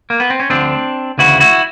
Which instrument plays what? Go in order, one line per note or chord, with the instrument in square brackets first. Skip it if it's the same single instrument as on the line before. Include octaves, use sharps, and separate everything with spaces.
[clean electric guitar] A#3
B3
C4
C#4
D2 D3 F3 C4 D4
D2 C#3 E3 E4 F#4
E4 F#4